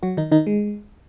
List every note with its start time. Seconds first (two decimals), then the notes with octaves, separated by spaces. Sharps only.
0.03 F#3 F#4
0.17 D#3 D#4
0.32 D#3 D#4
0.47 G#3